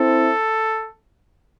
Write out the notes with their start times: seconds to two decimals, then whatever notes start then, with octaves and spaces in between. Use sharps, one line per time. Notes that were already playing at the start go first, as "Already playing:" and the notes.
Already playing: C4 E4 A4